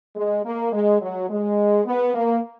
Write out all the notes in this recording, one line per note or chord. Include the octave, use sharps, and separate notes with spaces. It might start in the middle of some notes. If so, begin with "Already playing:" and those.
G#3
A#3
G#3
F#3
G#3
B3
A#3